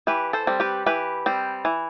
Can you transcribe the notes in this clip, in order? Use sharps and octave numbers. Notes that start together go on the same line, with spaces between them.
E3 G4 B4
A4 C5
G3 C4
G4 B4
E3 G4 B4
G3 C4
E3